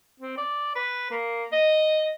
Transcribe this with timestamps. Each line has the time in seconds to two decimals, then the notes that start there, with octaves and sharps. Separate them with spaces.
0.20 C4
0.37 D5
0.75 B4
1.11 A#3
1.52 D#5